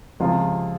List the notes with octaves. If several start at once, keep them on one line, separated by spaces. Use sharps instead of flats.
C#2 C3 F3 F4